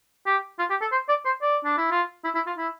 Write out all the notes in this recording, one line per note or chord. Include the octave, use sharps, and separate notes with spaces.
G4
F4
G4
A4
C5
D5
C5
D5
D4
E4
F4
E4
E4
F4
E4